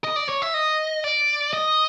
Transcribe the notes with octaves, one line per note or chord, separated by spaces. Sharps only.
D#5
D5
C#5
E5
D#5
D5
D#5